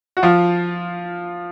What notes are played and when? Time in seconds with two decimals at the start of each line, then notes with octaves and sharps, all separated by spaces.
0.17 F#4
0.23 F3 F4